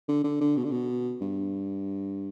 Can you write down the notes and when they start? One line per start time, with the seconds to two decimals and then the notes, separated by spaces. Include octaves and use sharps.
0.08 D3
0.24 D3
0.41 D3
0.57 B2
0.64 D3
0.71 B2
1.21 G2